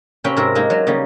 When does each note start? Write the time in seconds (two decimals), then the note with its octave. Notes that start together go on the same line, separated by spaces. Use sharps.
0.24 C3 A#3 C#4 G5 B5
0.36 G#2 C3 C4 A#4 E5
0.55 G#3 A#3 D#4
0.70 F#3
0.87 C#3 G3 A#3 B3